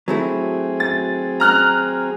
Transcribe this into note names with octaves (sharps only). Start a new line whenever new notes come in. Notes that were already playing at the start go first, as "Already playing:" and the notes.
F#3 A3 C4 E4 G#4
A6
A#5 F6 F#6